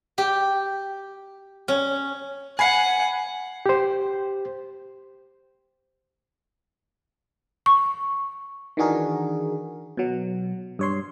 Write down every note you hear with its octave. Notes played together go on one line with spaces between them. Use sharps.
G4
C#4
F#5 G#5 B5 C7
G4 C5
C#6
D#3 E3 D4 F#4 G#4 A#4
B2 F#3
G2 C#5 C6